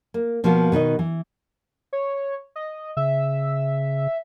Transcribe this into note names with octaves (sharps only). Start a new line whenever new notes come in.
A#3
B2 F3 A#3 B3 F4 F#4
B2 D#3 F#4 D#5
E3
C#5
D#5
C#3 E5